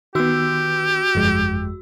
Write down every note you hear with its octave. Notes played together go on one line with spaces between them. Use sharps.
D#3 B3 F#4 G4 E6
G1 F2 G#3